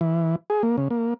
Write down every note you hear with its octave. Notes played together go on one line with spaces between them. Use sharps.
E3
G#4
A#3
C#3
A#3